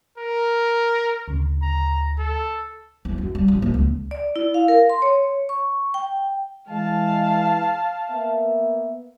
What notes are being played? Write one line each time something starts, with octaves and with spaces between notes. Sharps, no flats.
A#4
D2 C#3
A#5
A4
E2
F#2
G3
A1
A#3
C#2
D5
E4
F5
A#4
C6
C#5
C#6
G5
E3 G#3 F5 A5
A#3 B3 E5